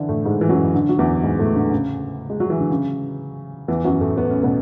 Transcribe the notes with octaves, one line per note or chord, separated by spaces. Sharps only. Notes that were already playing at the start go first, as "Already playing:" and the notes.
Already playing: D3 E3 D4 E4
A2 A3
G#2 G#3
E3
F#2 F#3
D3
F#3
E2 E3
G#2 G#3
A2 A3
D3
C#3
G#3
F#3
E3
D3
C#3
E2 E3
F#2 F#3
A2 A3
B3
C#4
B2 B3